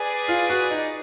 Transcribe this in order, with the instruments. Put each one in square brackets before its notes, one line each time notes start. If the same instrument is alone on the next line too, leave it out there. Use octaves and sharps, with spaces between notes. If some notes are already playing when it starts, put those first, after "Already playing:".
Already playing: [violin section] G#4 B4 D5
[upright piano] F4
F#4
D#4